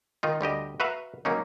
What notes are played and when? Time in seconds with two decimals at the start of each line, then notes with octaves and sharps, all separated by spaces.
0.23 D#3 D#4 F4
0.41 D2 G3 G4 D#5
0.80 F#4 B4 E5 F5 A#5
1.25 F#3 A#3 C#4 D#4